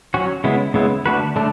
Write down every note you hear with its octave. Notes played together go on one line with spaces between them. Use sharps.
F#3 C#4 F#4
C#3 G#3 B3 E4
C#3 G#3 B3 E4
D3 A3 D4 F#4 B4
D3 A3 D4